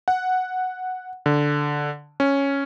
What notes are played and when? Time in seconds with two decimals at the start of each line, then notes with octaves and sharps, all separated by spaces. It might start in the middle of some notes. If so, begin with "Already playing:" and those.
0.08 F#5
1.26 D3
2.20 C#4